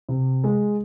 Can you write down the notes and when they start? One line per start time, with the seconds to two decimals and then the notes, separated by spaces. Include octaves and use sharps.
0.09 C3
0.44 G#3